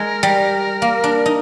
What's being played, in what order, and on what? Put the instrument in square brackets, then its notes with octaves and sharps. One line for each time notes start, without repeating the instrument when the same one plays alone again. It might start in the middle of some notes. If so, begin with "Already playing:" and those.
Already playing: [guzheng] G#3 [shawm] A#4
[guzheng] G3
A#3
D4
D#4